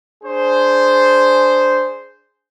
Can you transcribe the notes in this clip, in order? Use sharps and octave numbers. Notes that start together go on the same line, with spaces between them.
D4 G#4 C5